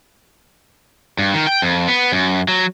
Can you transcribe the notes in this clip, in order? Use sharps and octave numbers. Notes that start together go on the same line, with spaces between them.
G2
D#3
G5
F2
B3
F#2
F#3